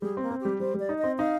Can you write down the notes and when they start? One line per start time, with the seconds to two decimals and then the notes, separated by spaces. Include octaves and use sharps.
0.02 G3 G#4
0.17 A#3 C4
0.31 C4
0.41 G3 G4
0.60 G3 C5
0.74 G3
0.80 D5
0.89 D#4
0.98 D#5
1.04 C4
1.18 D#4 F5